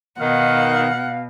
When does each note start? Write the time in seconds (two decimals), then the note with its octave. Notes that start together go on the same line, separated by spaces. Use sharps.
0.20 B2 D#3 F5 F#5